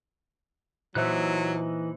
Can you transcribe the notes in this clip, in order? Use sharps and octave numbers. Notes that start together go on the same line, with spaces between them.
A#2 E3 F#3 D#4 C5 E5 F#6